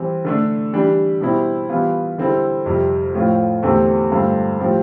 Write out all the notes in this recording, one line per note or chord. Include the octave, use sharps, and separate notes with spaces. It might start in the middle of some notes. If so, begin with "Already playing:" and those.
Already playing: E3 G3 C4
D3 A3 D4
E3 G3 D4 G4
B2 G3 C4 E4
E3 G3 B3 F4
D3 G3 C4 E4 A4
F2 C3 G3
A2 F3 C4 F4
E2 D3 A3 C4 G4
G2 D3 A3 C4 F4
A2 F3 C4 G4